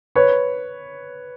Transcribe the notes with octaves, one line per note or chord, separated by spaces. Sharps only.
B4 C#5